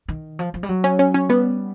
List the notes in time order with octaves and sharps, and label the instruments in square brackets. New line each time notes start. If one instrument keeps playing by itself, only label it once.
[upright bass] D#3
F3
F3
G3
F#3
[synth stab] C#4
C#4
C#4
[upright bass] G3 [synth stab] B3